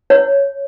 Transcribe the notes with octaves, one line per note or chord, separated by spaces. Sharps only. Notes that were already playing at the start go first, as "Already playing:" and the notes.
C#5